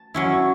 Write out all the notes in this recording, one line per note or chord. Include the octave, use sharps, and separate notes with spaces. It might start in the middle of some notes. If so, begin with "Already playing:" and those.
Already playing: A5
F#3 C#4 E4